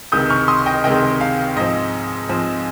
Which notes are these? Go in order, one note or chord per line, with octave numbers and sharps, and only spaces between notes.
C#2 C3 D#3 G#3 D#6 G6
C#6 F6
C6 D#6
D#5 G5
C#2 C3 D#3 G#3 D#5 G5
F5
G#2 F3 C4 D#5
G#2 F3 C4